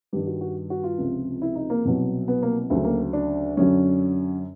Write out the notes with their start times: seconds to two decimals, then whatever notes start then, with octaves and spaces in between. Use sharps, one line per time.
0.13 G2 D#3 G3 G4
0.26 F#4
0.41 F#4
0.70 F#4
0.83 F4
0.98 C#2 C3 F3
1.42 E4
1.55 D#4
1.70 A#3
1.85 C2 B2 F#3
2.28 B3
2.43 A#3
2.70 D2 C#3 F#3 A3
2.84 A#3
3.13 D4
3.57 F#2 D3 F#3 C#4